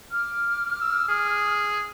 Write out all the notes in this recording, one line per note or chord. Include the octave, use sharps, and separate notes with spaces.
D6 F6
E6
G#4